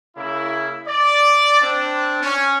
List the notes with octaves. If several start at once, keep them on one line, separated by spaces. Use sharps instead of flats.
C#3 A#3 E4
D5
C4 D4
C#4